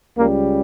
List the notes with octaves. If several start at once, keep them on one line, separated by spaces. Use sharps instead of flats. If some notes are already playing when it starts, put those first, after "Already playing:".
C#2 C#3 G3 A#3